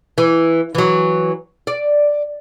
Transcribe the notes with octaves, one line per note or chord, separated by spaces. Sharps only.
E3
E3 F#3
D5